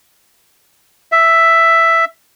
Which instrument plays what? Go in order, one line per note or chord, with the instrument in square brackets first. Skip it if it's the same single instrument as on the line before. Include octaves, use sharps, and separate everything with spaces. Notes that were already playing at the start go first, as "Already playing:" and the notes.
[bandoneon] E5